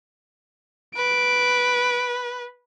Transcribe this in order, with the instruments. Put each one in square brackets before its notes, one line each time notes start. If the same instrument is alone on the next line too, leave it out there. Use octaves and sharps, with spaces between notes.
[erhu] B4 [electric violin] D7